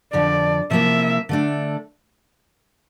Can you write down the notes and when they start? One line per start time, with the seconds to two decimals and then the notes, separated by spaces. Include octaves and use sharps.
0.13 F2 D3 F3 D5
0.70 C3 F3 A#3 E4 E5
1.29 D3 A3 D4